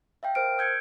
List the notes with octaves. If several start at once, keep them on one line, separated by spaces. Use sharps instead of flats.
E5 F5 G5
A#4 C5 F6 D7
E6 G6 G#6 C#7 D7